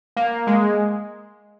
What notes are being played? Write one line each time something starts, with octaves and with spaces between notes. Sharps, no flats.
A#3
G#3